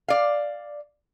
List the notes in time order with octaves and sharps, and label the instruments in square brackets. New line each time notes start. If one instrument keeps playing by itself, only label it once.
[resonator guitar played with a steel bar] D5 F5